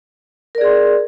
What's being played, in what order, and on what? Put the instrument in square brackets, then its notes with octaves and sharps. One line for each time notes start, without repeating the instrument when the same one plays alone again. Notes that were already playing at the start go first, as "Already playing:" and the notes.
[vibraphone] A#4
D5
G#4
C6